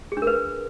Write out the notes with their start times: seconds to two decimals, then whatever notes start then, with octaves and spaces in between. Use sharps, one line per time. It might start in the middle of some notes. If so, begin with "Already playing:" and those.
0.12 G#4
0.17 D4
0.22 A#4
0.27 B4